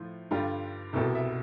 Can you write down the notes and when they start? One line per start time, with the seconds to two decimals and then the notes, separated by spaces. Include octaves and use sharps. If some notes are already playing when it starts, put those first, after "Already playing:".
Already playing: A2 F3 F4
0.31 G2 D3 G3 F4
0.93 C2 B2 G3 A4
1.15 E5